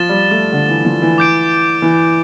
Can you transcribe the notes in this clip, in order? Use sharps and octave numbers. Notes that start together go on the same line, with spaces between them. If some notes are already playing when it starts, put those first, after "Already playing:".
Already playing: F3 A6 E7 G7
G3
A3
D3
E3
F3
E3
D6 G6 D7
E3